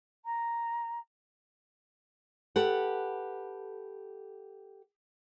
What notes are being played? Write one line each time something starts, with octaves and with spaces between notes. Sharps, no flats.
A#5
G4 A4 B4 F#5